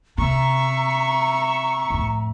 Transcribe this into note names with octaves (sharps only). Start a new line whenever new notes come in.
C3 E5 A#5 C#6
F2 A2